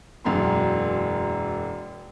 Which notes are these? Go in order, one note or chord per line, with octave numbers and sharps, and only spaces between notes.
E1 F#2 A#3 C6